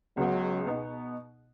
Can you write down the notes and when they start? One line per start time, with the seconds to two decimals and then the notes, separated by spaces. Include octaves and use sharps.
0.17 C#2 C#3 F#3 B3
0.66 B2 B3 D#4